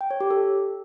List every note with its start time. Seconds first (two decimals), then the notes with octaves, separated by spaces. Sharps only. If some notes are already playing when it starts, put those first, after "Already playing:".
0.01 G5
0.11 C#5
0.21 G4
0.30 A4